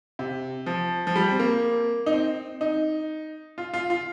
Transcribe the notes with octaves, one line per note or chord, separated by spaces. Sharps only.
C3
F3
F3
G3
C4
A#3
D#4
C4
D#4
F4
F4
F4